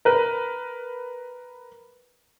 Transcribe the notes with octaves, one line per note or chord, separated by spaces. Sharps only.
A#4 B4